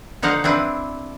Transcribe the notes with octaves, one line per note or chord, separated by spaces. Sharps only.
D3 F3 D#4 F5 F#5
C4 D4 E4 B4